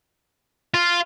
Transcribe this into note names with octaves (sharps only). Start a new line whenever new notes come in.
F4